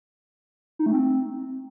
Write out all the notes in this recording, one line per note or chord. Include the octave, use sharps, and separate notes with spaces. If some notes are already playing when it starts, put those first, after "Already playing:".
D#4
A3
C4